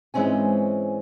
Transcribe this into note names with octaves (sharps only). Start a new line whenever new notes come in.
G#2 E3 G#3 C4 C#4 G#5